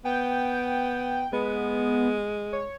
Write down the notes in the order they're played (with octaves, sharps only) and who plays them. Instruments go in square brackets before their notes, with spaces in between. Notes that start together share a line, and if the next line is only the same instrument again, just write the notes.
[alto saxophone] B3 [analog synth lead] G5
[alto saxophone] G#3 [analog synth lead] B3
[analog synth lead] C#5